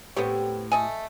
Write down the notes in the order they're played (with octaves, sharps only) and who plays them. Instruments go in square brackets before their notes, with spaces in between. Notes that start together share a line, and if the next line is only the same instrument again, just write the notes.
[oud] A2 G4 C#5 [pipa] B3 C4
[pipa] A3 D#5 G#5